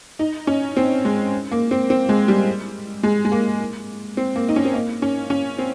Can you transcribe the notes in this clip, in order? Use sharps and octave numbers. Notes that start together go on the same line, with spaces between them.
D#4
C#4
C4
G#3
A#3
C4
C4
G#3
G3
G#3
G#3
A#3
C4
A#3
D#4
C#4
C4
A#3
C#4
C#4
C4